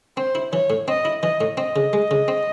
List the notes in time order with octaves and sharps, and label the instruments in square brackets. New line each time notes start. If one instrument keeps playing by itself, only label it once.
[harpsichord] C4 [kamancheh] C5
[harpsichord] E4
[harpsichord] E3 [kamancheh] C#5
[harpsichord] A2
[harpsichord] C4 [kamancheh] D#5
[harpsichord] E4
[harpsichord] E3 [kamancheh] D#5
[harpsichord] A2
[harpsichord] C4 [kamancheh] D#5
[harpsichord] C#3
G#3
C#3
C4